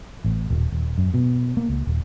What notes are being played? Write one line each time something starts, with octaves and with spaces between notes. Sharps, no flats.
A1
D#1
D#1
F#2
B2
A#3
C#2
D#1